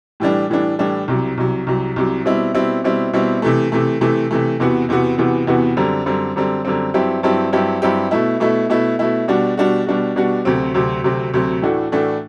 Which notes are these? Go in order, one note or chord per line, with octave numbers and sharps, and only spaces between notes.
A2 E3 G3 D4
A2 E3 G3 D4
A2 E3 G3 D4
C2 C3 F#3
C2 C3 F#3
C2 C3 F#3
C2 C3 F#3
B2 G3 C4 E4
B2 G3 C4 E4
B2 G3 C4 E4
B2 G3 C4 E4
C3 E3 A3
C3 E3 A3
C3 E3 A3
C3 E3 A3
E2 C3 E3 B3 F#4
E2 C3 E3 B3 F#4
E2 C3 E3 B3 F#4
E2 C3 E3 B3 F#4
F#2 D3 G3 C4
F#2 D3 G3 C4
F#2 D3 G3 C4
F#2 D3 G3 C4
G2 F#3 C4 E4 G4
G2 F#3 C4 E4 G4
G2 F#3 C4 E4 G4
G2 F#3 C4 E4 G4
B2 A3 E4
B2 A3 E4
B2 A3 E4
B2 A3 E4
B2 G3 D4 F#4
B2 G3 D4 F#4
B2 G3 D4 F#4
B2 G3 D4 F#4
D2 C3 F#3 C4
D2 C3 F#3 C4
D2 C3 F#3 C4
D2 C3 F#3 C4
A2 E3 A3 D4 F#4
A2 E3 A3 D4 F#4